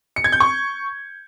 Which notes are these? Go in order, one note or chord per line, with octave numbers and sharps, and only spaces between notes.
C#7
G#6
G6
C#6